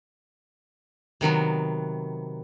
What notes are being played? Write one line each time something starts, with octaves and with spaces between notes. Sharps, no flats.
C3 D#3 F#3 B3